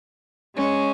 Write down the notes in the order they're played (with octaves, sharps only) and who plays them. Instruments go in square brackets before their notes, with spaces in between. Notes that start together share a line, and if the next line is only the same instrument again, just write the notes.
[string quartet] G#3 C#4